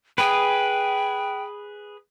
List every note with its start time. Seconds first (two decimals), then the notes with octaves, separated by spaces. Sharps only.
0.18 G#4 B4 G5